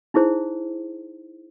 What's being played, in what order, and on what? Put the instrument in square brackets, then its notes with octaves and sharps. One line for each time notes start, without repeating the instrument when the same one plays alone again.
[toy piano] D#4 E4 G#4 C5